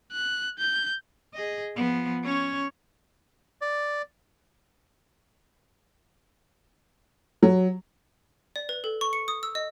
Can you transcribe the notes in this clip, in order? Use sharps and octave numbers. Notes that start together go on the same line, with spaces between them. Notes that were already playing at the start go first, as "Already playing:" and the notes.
F#6
G6
G#4 D#5
F3 B3
C#4 C#5
D5
F#3
D5
B4
A4
C#6
C#7
D#6
E6
D#5